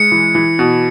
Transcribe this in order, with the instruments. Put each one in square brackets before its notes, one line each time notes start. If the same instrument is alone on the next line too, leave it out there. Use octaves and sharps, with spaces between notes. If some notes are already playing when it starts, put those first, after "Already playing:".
Already playing: [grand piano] G#3 [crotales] C#7
[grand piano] E3
E3
B2